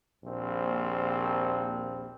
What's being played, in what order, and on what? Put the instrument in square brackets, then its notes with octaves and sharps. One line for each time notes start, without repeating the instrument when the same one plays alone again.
[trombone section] A#1 D#2 A#2 C4